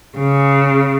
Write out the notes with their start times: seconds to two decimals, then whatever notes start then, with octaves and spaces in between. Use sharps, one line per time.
0.18 C#3